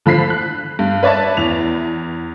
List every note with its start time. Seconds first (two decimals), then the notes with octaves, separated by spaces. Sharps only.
0.06 D3 F3 B5 B6 C7
0.30 F#6
0.79 G2
1.03 B4 C#5 D5 E5 A5
1.37 E2 F7